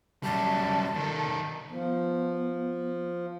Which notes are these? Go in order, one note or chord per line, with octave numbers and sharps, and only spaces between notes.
F#2 G3 A5
D#3 A4
F3 B3